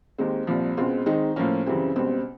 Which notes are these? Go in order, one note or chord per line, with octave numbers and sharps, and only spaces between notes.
D#2 D#3 G#3 C4
C2 A#2 F3
C#2 B2 G#3 C4 F4
D#3 G#3 C4 D#4
A2 F3 A#3 C#4
F#2 C#3 E3 G3 C4
C#2 B2 G3 C4